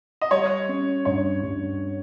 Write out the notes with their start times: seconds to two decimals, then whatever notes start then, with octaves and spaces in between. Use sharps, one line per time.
0.21 D#5
0.31 G3 C#5
0.69 C#4
1.05 G2 C#5
1.43 G2